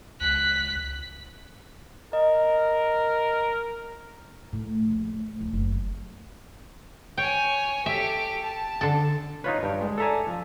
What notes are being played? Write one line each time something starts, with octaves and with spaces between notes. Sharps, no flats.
C#2 F#6 B6
A#4 D#5
A2
A#1
A3
D1
F#1
C#5 G5 G#5
G4 A4 E5
A5
D3 A4
D#4 F4 B4 C#5
G2 G5
G#3
A4 D5 E5 G#5 A#5 E6
F3